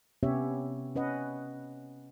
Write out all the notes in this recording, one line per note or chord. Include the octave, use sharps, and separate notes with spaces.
C3 B3 C#4 G4 C#5 E5
C#4 B4 D#5 F#5